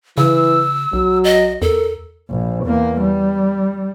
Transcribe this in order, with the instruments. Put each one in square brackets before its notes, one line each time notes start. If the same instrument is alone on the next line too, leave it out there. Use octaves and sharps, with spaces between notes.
[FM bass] C#3 [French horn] E3 [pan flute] E6
[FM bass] B1 [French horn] F#3
[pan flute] D#5
[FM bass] E2 [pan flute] A4 [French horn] A#4
[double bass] A#1
E2 A#3
G3